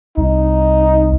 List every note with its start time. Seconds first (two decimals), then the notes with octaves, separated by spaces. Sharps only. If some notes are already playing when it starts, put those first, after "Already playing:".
0.17 C2 D#4